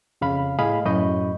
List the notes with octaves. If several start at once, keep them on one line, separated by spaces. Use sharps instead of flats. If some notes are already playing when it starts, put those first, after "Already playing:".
F2 C#3 F5 B5 F6
A2 G#4 D#5 F5 B5
F#2 A2 D#5 B5 C#6 G6